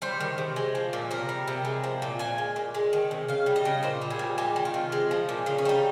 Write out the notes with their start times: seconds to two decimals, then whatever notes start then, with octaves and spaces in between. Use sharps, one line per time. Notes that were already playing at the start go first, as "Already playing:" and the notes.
0.02 G3 C5
0.20 D#3
0.38 C3
0.56 G#3
0.75 F3
0.93 A#2
1.11 C3 A#4
1.29 G3
1.48 C3
1.65 G#3
1.84 F3
2.02 A#2
2.19 A#2 G#5
2.38 G#3
2.56 A#2
2.74 G#3
2.93 D#3
3.11 C3
3.28 C#3 F5
3.46 G3
3.56 D#5
3.65 C#3
3.83 A#2 C5
4.01 G3
4.10 G#4
4.19 A#2
4.38 G#3 G4
4.56 D#3
4.65 F4
4.74 C3
4.92 G#3
5.11 F3
5.29 A#2
5.46 C#3 D#4
5.58 C#4
5.65 G3 D#4